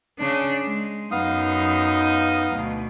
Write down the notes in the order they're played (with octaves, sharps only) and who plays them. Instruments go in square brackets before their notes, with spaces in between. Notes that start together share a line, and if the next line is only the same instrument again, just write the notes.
[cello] C#3 D4
G#3
[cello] F#2 D#4 [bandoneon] B3 F5 D#6
[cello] D2 B2